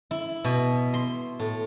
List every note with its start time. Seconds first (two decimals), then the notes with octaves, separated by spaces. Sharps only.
0.11 E4
0.44 B2
0.94 C6
1.39 A2